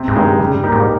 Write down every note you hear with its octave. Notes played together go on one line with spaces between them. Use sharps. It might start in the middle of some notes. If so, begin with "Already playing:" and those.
Already playing: C3
G#2
G2 D#3 G#3 D#4
C#3 G3
G2
A#3 D#4 G4
G#2